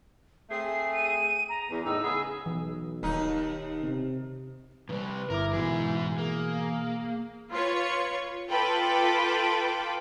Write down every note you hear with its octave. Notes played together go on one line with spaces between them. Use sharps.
A3 C4 G#4 C7
D#7
A#5
E2
A2 D#4 E6
C#3 B3 G#4
B1 E3
D#1 D#2 D#4
C3
A2 C3 G3 B4
G1 E4 A#4 A#5 D6
G#2 B2 E3 G#4
A#3 G#4
F4 B4 C#5
F4 A4 B4 G5 B5 D6